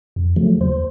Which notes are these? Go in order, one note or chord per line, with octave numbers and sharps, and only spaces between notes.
F2
C#3 F3 F#3 A3
D#2 C5